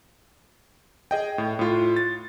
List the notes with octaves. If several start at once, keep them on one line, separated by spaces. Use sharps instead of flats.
G#4 D#5 G5
A2
A2 F4
A6